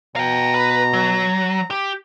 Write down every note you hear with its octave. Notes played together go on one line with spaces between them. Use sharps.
B2 F5 G5 A#5
B4
F#3
G4